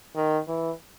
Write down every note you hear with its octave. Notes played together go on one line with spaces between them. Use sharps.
D#3
E3